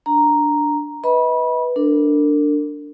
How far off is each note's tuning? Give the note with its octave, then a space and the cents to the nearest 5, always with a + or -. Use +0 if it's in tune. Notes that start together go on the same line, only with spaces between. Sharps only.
D4 +0 A#5 +0
B4 +0 D#5 +35 B5 -25
D4 +0 A#4 -40